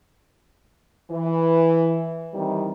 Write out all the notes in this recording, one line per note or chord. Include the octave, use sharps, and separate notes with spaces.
E3
C3 D#3 E3 G3